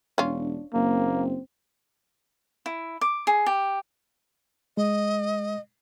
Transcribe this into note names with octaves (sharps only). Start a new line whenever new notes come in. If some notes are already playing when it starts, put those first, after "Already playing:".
E1 C#4 D4 F4
F#1 A#3 C4
E4
D6
G#4
G4
G#3 D#5